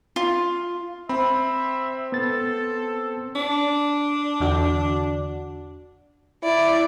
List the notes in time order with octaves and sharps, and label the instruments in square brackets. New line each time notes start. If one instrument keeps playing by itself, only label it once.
[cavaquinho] F4
[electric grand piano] C4 [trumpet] E5 [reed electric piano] B5
[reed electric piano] B3 A6 [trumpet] A4
[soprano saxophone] D4
[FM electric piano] E2 D3 F#4
[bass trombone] E4 [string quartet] D5